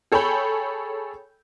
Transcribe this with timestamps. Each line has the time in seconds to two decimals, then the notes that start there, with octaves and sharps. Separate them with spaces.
0.12 G#4 A4 C#5 G5 B5 G6